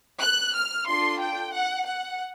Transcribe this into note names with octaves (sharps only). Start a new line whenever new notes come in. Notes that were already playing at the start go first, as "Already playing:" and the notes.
F#6
F6
D4 F4 A4 C6
G5
F#5
F#5